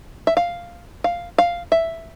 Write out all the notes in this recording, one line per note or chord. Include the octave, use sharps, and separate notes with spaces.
E5
F5
F5
F5
E5